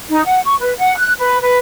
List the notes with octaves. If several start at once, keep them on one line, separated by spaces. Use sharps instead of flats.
D#4
F#5
C#6
B4
F#5
F#6
B4
B4